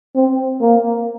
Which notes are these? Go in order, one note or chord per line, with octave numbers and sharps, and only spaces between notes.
C4
A#3